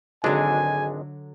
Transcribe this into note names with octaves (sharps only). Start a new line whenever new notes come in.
G#1 D3 F#3 G#3 D4 G#5